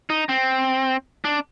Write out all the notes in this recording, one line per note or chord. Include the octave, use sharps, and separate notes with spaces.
D#4
C4
D4